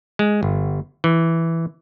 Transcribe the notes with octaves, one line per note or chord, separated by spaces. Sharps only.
G#3
G1
E3